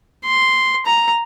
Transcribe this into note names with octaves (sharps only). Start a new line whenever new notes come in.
C6
A#5